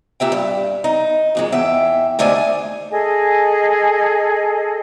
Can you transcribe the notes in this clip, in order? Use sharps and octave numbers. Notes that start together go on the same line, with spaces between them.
A#2 G4 E5 G5
G2
D#4
F2 A#2 G#3
E2 E5 G5
D#2 D3 A3 D4 C5 G#5
G#4 A4 D#5 G#5